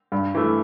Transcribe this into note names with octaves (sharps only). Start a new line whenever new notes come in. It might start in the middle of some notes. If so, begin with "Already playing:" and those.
G2
E3 A3